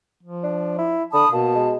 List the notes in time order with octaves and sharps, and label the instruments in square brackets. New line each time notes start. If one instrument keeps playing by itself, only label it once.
[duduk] F3
[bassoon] D4
E4
[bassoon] D3 [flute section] A5 B5 D#6
[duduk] B2 [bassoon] A#3 [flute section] A5
[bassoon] G#3